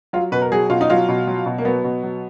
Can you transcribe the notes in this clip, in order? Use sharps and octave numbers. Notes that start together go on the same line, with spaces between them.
F#3 F4
B2 B4
A#4
F#3 G#4
B2 F4
D#4
F#3 F4
B2
F#3
B2
A#3
F#3 B3
B2
F#3